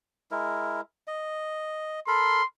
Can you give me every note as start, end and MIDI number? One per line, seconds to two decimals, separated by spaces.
0.31 0.81 56
0.31 0.81 64
0.31 0.81 70
1.08 2.00 75
2.08 2.42 69
2.08 2.42 70
2.08 2.42 83
2.08 2.45 84